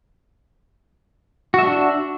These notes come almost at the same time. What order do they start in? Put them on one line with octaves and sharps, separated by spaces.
F#4 E5 D4